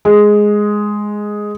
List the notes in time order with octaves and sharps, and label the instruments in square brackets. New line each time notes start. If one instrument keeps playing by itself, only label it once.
[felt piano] G#3